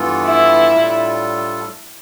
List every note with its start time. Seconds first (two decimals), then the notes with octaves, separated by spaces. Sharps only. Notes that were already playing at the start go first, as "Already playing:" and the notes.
Already playing: G2 E3 B3 F4 A4
0.26 E4
0.72 A2 G3 D4 F4 A4